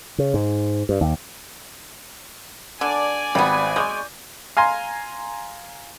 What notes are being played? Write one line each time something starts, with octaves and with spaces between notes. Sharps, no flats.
C#3
G#2
G2
D#2
D3 D5 G#5
G#1 G3 B3 B5
G#3 C#6 D6 G6
F5 G#5 A#5 C6